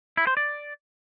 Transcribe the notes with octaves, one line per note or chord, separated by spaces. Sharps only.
E4
C5
D5